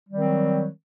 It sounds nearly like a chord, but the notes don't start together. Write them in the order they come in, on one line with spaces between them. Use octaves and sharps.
G3 D#3 C4 F#3